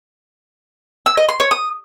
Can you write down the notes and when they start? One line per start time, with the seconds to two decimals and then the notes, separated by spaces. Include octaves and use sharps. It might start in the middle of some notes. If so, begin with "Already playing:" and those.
1.06 E6
1.17 D#5
1.29 C6
1.40 C#5
1.51 D#6